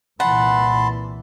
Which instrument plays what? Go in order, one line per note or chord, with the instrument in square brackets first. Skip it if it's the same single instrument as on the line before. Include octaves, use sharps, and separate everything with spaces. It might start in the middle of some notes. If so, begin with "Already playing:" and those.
[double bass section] C2 A#2 E3 [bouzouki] F#5 [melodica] A5 B5 C6